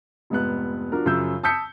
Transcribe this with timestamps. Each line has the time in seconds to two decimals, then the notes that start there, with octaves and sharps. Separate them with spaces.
0.30 F1 G#2 B3 F#6
0.92 F3 D4 F#4 A#4
1.06 F#2 C#3 F3 E6 G6
1.43 A5 D#6 E6 G6 B6 C#7